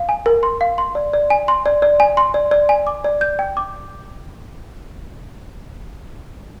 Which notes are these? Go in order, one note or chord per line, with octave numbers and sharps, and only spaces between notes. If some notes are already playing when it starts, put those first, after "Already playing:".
Already playing: F5
G#5
A#4
C6
F5
C6
D5
D5
G#5
C6
D5
D5
G#5
C6
D5
D5
G#5
D6
D5
G6
G5
D6